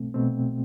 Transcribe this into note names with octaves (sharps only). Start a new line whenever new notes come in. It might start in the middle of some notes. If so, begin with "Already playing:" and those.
Already playing: C2 B2 A3 C4
C2 B2 A3 C4